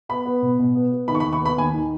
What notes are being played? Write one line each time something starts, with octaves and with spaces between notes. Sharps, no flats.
B3 B5
B3
B2
B2
B3
B3
D#3 B5
C#6
B5
D#2
C#6
B3 B5
D#2 G#5
D#3